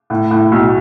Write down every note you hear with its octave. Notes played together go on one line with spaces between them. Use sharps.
A2
A2
B1